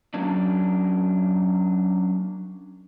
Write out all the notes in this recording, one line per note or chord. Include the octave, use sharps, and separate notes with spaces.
F#3 A#3 C#4 D4